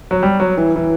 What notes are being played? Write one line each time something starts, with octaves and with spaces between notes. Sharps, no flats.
F#3
G3
F#3
E3
E3